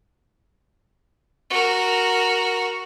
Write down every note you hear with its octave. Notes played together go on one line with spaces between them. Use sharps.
F#4 A#4